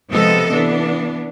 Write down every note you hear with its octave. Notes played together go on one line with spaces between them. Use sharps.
C3 F3 G#3 B3 A4 D#5
E3 B3 D4